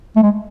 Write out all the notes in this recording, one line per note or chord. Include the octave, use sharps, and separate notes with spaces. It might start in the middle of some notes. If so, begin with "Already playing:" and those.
A3
G#3